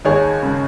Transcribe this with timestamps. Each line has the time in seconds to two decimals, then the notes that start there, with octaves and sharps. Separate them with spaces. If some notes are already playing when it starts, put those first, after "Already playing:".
0.05 D#2 G#4 C#5
0.43 C#3